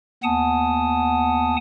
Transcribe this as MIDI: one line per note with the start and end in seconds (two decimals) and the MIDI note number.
0.23 1.56 39
0.23 1.56 59
0.23 1.56 78
0.23 1.56 80
0.23 1.56 81
0.23 1.56 87